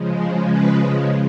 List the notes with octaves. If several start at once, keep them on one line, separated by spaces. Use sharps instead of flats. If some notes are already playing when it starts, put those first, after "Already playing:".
Already playing: C#3 F3 G#3
B4